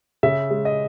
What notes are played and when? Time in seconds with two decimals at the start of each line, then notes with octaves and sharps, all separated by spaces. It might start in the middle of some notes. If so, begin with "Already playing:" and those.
0.23 C#3 E5
0.50 G#3
0.65 D#5